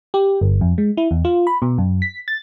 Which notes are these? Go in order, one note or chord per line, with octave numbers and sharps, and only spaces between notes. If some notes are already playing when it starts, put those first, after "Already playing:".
G4
G1
F2
G#3
E4
E2
F4
B5
B2
F#2
B6
A6